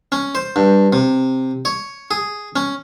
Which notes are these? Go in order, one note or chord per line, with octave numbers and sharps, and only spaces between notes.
C#4
C5
G2
C3
C#5
G#4
C#4